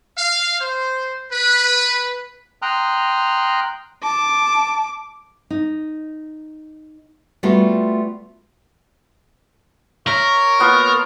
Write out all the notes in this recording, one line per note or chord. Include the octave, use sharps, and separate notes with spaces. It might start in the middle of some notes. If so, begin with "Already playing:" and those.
F5
C5
B4
G5 A#5 C6 D#6 F6 F#6
A5 D6
D#4
G3 A3 B3 F4 F#4
A#4 C#5 E5
A#3 B3 F4